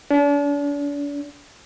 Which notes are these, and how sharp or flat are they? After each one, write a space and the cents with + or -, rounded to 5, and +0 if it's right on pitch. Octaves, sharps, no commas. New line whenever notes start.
D4 -40